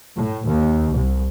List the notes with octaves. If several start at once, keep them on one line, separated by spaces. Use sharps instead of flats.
A2
D#2
C2